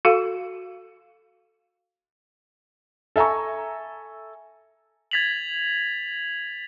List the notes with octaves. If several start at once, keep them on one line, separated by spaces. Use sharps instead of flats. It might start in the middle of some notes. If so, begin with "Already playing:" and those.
F#4 A4 F5
A4 E5 G#5 A#5 C#6
G#6 A6 B6 F7 F#7